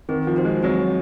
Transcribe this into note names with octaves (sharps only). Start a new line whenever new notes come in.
D#3 C4
F3
D#4 F#4 C5
G#3
F#3 C4